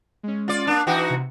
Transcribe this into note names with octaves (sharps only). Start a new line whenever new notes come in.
G#3 C#4
F4 D5
A#3 D4
E3 D#4 F#4 G5 D6
C3